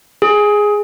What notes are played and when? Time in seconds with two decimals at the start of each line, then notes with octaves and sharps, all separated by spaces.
0.22 G#4